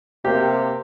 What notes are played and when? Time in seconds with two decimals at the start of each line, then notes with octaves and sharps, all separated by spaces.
0.25 C3 A#3 G4